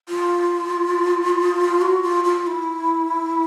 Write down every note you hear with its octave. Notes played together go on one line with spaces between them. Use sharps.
F4
F#4
F4
F4
E4